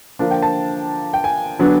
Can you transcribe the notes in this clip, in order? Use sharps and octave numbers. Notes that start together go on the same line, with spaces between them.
D3 F3 A#3 D4
G5
A5
G5
G#5
D3 F#3 B3 D4